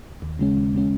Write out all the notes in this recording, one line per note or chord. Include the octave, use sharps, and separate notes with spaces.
D#2
C#3 G#3 C#4
D#2
C#3 G#3 C#4